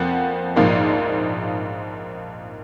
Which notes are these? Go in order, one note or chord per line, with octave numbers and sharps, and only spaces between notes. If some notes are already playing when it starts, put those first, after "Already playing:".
Already playing: F2 F3 A#3 F#5
A#1 G#2 F3 A#3 F5